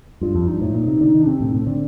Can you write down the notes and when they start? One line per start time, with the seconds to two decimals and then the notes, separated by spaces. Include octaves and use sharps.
0.21 G2 F4
0.35 F2
0.47 G2 D#4
0.62 A2
0.74 A#2
0.88 C3
1.01 D3
1.14 D#3
1.22 D4
1.27 C3 C4
1.41 A2
1.54 A2
1.67 D3